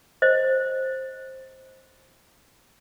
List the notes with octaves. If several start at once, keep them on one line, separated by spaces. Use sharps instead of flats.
C5 D#5